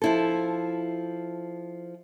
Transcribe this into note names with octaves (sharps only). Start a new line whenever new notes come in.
F3 E4 A4